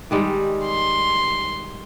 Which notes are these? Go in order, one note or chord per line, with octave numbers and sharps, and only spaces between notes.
D#3 G3 G#3
C6